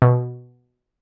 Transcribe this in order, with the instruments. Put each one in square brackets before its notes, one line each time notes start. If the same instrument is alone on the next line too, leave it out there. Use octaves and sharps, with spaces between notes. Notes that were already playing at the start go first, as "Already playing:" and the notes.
[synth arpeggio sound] B2